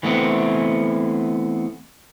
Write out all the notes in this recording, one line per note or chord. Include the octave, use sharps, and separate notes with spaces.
E3 A3 B3 C4